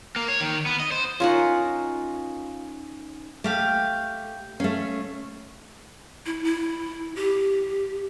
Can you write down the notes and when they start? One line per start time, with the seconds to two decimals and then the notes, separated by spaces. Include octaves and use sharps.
0.16 A#3
0.28 C#5
0.40 D#3
0.66 B3
0.80 D#5
0.92 C5
1.20 C#4 D#4 F4 A#4 F#5
3.44 A3 G4 F5 G5
4.60 A3 C#4 F5
6.26 E4
6.44 E4
7.16 G4